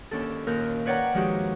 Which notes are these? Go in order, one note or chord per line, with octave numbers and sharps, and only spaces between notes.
D#2 C#4 D4 A4
D#2 A#2 A#4 F#6 G6
B4 C#5 D5 F#5 G5 A#5
D#3 F3 G#3 D#4 F#4 G4